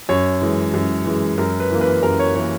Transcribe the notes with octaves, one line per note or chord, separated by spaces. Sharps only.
F#2 C#5
E3 G#3
F#2
E3 G#3
F#2 A#4
B4
E3 A#3
B4
F#2 A#4
C#5
E3 A#3 C#5